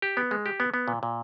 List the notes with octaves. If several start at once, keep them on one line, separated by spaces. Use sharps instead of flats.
G4
B3
G#3
G4
B3
B3
A#2
A#2